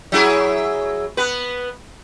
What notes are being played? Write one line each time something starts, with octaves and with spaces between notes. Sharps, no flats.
F#3 E4 G#4
B3 B4